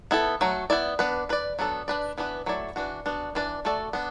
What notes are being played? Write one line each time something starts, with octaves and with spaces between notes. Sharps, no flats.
B3 E4 A4
F#3 A3 F#4
B3 E4 D5
B3 D4 B4
D4 B4 D5
F#3 B3 D4 A4
D4 B4 D5
E3 B3 D4 B4
F#3 A3 E4 D5
E3 D4 F#4
B3 D4 F#4
E3 D4 B4 D5
A3 F#4 A4 D5
B3 D4